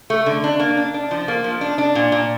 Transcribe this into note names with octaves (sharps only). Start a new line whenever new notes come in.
A3
D3
D4
A#3
D4
D4
F3
A#3
F3
D4
D4
A#2
A#2